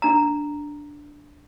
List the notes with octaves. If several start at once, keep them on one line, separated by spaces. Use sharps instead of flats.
D4 A#5